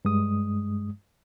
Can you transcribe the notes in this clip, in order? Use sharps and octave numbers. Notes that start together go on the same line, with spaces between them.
G2 G#3 D#6